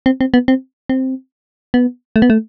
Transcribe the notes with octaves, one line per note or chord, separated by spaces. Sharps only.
C4
C4
B3
C4
C4
B3
A3
B3
A3